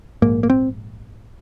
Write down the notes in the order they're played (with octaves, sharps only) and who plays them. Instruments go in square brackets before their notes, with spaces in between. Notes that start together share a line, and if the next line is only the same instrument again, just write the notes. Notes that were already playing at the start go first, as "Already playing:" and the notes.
[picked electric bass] A#1 G#2 A#3
A#3
C4